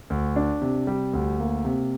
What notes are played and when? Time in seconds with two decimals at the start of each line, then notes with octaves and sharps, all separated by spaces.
0.10 D2
0.36 D4
0.62 C3
0.87 G3
1.13 D2
1.39 A#3
1.65 C3